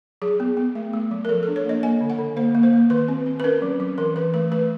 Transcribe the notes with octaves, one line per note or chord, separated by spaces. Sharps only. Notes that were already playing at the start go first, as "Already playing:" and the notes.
F#3 G#4
B3
B3
A3
A3
F#3
A#4
F3 A4
D4 A4
C#5
A#3 D#5
A#3 G#5
D3
F#5
D3
A#3 C5
A#3
C5
A#3
D#3 B4
C4
C4
B4
C#4 A#4
F#3
F#3
E3 A#4
E3 B4
A3 B4
A3 B4